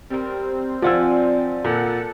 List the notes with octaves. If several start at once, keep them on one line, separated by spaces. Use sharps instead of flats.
G3 C4 A#4
F3 F4 D5 F#5 G#5 E6
A#2 A4 F#5 A5